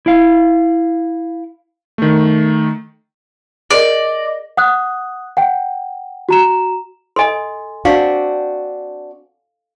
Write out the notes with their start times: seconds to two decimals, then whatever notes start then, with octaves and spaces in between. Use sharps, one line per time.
0.06 E4 F5
1.98 D#3 A3
3.71 G#4 A#4 D5 D#5
4.57 F#5 D#6 F#6
5.37 F#5 G5
6.29 F#4 A#5 E7
7.16 A4 D#5 G#5 C6
7.85 C4 D4 F#4 F5